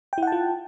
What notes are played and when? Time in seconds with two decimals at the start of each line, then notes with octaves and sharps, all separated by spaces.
0.13 G5
0.18 E4
0.23 F#5
0.27 A5
0.32 F4